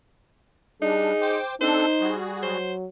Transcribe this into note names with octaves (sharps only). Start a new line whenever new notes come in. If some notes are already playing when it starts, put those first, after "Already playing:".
G3 D4 D#4 G#4
C5 G5 D6
C4 D4 D#4 A4 C5
G3 F#4 G#4
F#3 C5